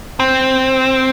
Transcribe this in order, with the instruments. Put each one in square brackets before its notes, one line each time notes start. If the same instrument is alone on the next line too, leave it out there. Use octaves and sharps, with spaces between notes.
[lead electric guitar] C4